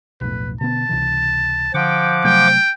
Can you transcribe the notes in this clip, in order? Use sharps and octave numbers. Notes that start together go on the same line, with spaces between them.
B1 F2 A2 B4
B2 D3 B3 A5
C#2 C3 E3
D3 F3 F#5 G5 D6
C3 F#3 A3 G5